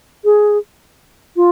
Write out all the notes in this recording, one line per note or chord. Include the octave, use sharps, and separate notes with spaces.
G#4
F4